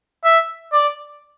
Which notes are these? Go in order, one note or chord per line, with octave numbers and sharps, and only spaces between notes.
E5
D5